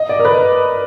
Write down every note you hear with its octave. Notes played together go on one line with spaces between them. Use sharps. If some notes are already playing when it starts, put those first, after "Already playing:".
Already playing: D#5
D5
A#4
B4